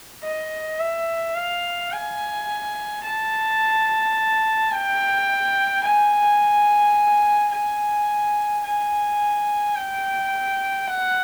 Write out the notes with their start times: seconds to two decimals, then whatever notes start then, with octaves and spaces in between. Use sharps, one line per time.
0.24 D#5
0.80 E5
1.35 F5
1.92 G#5
3.03 A5
4.71 G5
5.83 G#5
7.51 G#5
8.63 G#5
9.75 G5
10.88 F#5